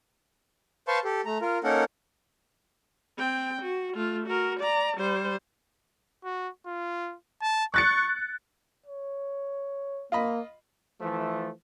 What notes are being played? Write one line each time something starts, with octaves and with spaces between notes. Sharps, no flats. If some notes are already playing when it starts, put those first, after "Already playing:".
B4 C5 F5 A5 C6 C#6
G4 A4
A3 A#5
F4 A#4
A#3 C#4 D#4 A4 A#4 F#5
C4 G5
F#4
A3 F4
F#4 A#4
D5 A#5
G3 C5
F#4
F4
A5
C#6 F#6 A6 C#7
C#5
A#3 F4 D#5 B5
E3 F3 A3